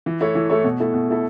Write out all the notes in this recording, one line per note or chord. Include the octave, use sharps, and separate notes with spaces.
E3
A3 E4 A4 C#5
E3
A3 E4 A4 C#5
B2
A3 E4 A4
B2
A3 E4 A4